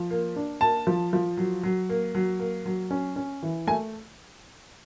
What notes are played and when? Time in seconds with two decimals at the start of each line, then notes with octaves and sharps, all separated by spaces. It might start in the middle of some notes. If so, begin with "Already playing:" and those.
Already playing: F3
0.11 A#3
0.36 D4
0.61 A#3 A5
0.87 F3
1.13 F3
1.37 F#3
1.63 F#3
1.89 A#3
2.15 F#3
2.39 A#3
2.66 F#3
2.91 C#4
3.16 C#4
3.43 E3
3.67 A3 G#5